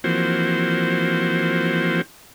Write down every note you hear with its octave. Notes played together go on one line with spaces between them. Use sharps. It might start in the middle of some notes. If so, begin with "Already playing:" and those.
E3 F3 A#3 C4 F#4 C5